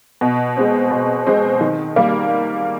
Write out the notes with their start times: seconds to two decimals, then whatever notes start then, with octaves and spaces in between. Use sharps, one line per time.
0.21 B2
0.57 G#3 C4
0.91 B2
1.27 G#3 C4
1.61 D#3
1.96 G3 A#3